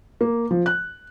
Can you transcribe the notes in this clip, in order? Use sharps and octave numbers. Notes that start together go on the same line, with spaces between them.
A#3
F3
F#6